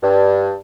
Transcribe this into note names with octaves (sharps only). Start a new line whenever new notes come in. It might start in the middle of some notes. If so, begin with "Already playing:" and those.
G2